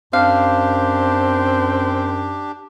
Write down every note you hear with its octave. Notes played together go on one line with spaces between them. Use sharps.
F#2 C4 D4 G4 F5